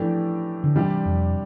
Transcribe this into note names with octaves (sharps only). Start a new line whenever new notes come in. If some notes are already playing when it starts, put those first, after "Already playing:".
Already playing: A2 E3 F3 A3 D4 G4
D3
C3 E3 G3 D4 G4
F2